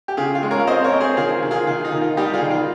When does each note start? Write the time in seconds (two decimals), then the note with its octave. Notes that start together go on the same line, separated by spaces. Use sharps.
0.08 G4
0.17 C#3 F4 G#4
0.35 F4
0.43 G#3
0.51 A#4 C#5
0.60 F5
0.67 C4 C5 D#5
0.84 A#4 C#5
0.93 C4
1.00 G#4 C5
1.17 D#3 F4 G#4
1.43 D#3
1.51 F4 G#4
1.67 D#3 F4
1.85 D#4
1.92 D#3
2.01 F4
2.17 G3 D#4 G4
2.34 F4 G#4
2.42 D#3
2.51 F4